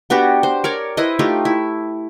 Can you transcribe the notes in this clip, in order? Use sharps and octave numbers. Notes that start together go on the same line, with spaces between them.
B3 D4 F#4 G4
C5
A#4 C#5 D5
E4 B4 C5 D#5
A3 D#4 F4 G4
E4